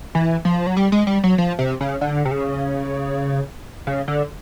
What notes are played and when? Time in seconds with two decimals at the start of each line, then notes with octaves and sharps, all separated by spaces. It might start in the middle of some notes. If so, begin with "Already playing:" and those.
0.15 E3
0.45 F3
0.67 F#3
0.77 G3
0.92 G#3
1.07 G3
1.24 F#3
1.38 F3
1.59 C3
1.81 C#3
2.01 D3
2.25 C3
2.31 C#3
3.87 C#3
4.08 D3